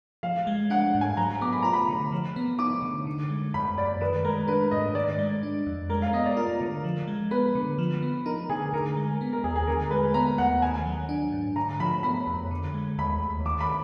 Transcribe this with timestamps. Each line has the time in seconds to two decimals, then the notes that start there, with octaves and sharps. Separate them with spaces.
0.23 F3 F5
0.47 G#3
0.70 D4 F#5
0.95 G#2
1.01 G#5
1.17 F#3 A#5
1.41 B3 D6
1.53 B5
1.62 F4 A#5
1.73 B5
1.89 D3
2.12 F3
2.36 B3
2.59 D#4 D6
2.82 D3
3.07 D3
3.30 G#3
3.54 F#2 B5
3.78 F#2 D5
4.01 D#3 B4
4.25 G#3 A#4
4.48 D4 B4
4.71 G#2 D#5
4.95 D#3 D5
5.19 G#3
5.43 D4
5.66 F2
5.90 G#3 A#4
6.02 F5
6.13 B3 D#5
6.26 D5
6.37 F4 A#4
6.61 D3
6.84 F3
7.07 G#3
7.31 B3 B4
7.55 D3
7.78 F3
8.02 B3
8.26 D#4 A#4
8.49 D3 G#4
8.73 D3 A#4
8.97 G#3
9.21 B3
9.33 A#4
9.44 D#2 G#4
9.56 G#4
9.67 D3 A#4
9.91 G#3 B4
10.14 B3 A#5
10.38 D#2 F#5
10.62 D#3 G#5
10.86 F#3
11.09 D4
11.32 G#2
11.56 D3 A#5
11.80 F3 B5
12.03 B3 B5
12.27 F2
12.51 D3
12.74 G#3
12.98 D#2 B5
13.22 D#2
13.45 D#3 D6
13.61 B5